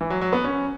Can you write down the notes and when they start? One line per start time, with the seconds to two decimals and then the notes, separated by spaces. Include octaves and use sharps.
0.01 E3
0.10 F#3
0.21 F#3
0.33 B3
0.44 C#4